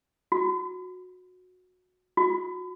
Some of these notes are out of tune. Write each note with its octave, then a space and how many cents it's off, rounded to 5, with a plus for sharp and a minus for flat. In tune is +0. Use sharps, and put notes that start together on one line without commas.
F#4 -20
F#4 -30